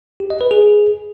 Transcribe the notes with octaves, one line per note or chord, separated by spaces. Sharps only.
G4
D#5
B4
G#4